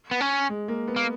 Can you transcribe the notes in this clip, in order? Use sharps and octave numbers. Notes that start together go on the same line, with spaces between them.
B3
C#4
G#3
A#3
B3
A#3